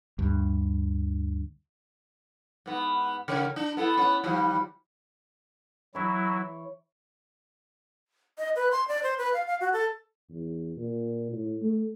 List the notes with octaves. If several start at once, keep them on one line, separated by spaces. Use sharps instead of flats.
D2 G2
G#2 B3
C#3 A#4 C#5
D4
B3 E4 A4
B3 C#4
D#2 F3 G3
E3 F#3 E4 C#5
D#5
B4
C6
D5
C5
B4
F5
F5
F#4
A4
E2
A#2
A2
A3